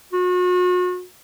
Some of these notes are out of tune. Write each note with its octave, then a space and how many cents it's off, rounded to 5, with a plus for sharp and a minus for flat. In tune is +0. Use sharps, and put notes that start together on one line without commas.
F#4 -40